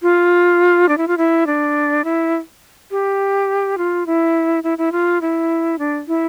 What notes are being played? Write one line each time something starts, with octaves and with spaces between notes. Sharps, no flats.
F4
D4
E4
F4
E4
D4
E4
G4
F4
E4
E4
E4
F4
E4
D4
E4